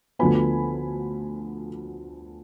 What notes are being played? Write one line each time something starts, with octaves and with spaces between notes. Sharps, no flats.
D2 D3 F3 B3 G#5 B5